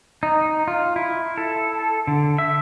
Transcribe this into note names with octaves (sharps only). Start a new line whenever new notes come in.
D#4
F4
E4
A4
D3
E5